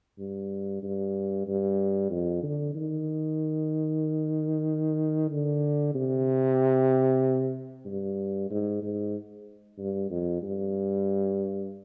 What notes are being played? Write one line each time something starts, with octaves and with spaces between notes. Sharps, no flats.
G2
G2
G2
F2
D3
D#3
D3
C3
G2
G#2
G#2
G2
F2
G2